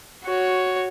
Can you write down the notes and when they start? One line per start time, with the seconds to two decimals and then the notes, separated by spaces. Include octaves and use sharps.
0.24 F#4 C#5